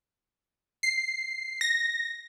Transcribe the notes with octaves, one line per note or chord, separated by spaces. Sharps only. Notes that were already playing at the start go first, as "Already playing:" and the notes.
C7
A#6